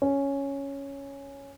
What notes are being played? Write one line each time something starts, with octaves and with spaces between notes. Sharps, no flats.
C#4